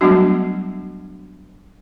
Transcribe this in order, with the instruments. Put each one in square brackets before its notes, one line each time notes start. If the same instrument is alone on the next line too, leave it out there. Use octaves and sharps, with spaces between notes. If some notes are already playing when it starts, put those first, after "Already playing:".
[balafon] F#3 G3 A3 B3 D4 F#4